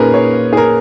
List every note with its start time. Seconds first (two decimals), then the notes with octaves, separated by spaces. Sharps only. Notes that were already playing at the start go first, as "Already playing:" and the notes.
Already playing: A#2 C#4 D#4 G#4 A#4 B4
0.14 C#5
0.53 G#4
0.57 A#4